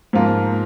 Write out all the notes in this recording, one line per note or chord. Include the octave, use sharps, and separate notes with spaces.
G#2 F3 A#3 F4